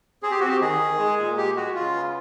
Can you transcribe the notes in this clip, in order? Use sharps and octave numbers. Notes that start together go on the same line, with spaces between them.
C4 G#4
G4
C4 F#4
G4
D#3 G#4
D#3
G#3
A#2
G#3 G4
G#3 F#4
C#3 F4
B3